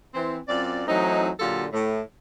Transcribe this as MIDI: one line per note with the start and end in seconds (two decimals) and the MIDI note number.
0.14 0.38 52
0.14 0.38 60
0.48 0.83 42
0.48 0.83 60
0.48 0.83 65
0.48 0.83 74
0.87 1.30 52
0.87 1.30 54
0.87 1.30 57
0.87 1.30 60
0.87 1.30 63
1.40 1.66 46
1.40 1.66 50
1.40 1.66 54
1.40 1.66 65
1.40 1.66 67
1.40 1.66 69
1.73 2.01 45